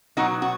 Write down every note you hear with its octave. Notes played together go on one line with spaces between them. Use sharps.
B2 F#3 D#4 F#4
F#4